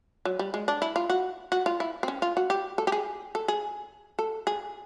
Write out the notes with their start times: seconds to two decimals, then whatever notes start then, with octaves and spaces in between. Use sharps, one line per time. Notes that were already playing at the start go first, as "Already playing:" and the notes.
0.25 F#3
0.39 G3
0.54 G#3
0.68 D4
0.82 E4
0.96 F4
1.10 F#4
1.52 F#4
1.66 F4
1.80 E4
2.03 C4
2.08 C#4
2.22 F4
2.37 F#4
2.50 G4
2.78 A4
2.87 G4
2.92 G#4
3.35 A4
3.48 G#4
4.19 A4
4.47 G#4